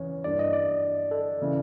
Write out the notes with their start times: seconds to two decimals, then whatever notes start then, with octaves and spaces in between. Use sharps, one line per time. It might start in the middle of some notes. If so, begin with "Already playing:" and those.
Already playing: E2 C#3 C#5
0.24 G2 E3 G3 A#3 D4 D5
0.39 D#5
0.53 D5
1.11 A4
1.41 C#3 E3